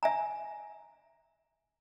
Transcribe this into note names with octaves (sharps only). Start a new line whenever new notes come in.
E5 G#5 A#5